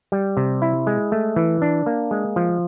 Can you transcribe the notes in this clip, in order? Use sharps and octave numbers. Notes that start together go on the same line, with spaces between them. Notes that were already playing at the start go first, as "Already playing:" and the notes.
G3
C3
E4
G#3
A3
E3
D4
A#3
G#3
F3